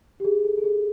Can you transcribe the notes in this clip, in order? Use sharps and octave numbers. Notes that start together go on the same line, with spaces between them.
G4
G#4
A4
A4
G#4